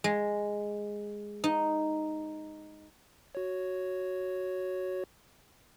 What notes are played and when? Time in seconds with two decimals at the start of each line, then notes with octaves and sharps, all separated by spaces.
0.04 G#3
1.44 D#4
3.35 F#4 C#5